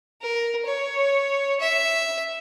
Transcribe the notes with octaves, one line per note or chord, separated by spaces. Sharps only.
A#4
C#5
E5